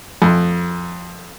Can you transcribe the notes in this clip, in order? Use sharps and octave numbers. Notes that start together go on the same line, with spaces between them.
F2